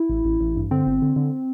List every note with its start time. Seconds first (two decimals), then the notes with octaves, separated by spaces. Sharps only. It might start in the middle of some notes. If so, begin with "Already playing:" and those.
Already playing: E4
0.09 A1
0.25 A1
0.41 A1
0.56 G2
0.71 D3 C4
0.86 G1
1.02 D3
1.16 D3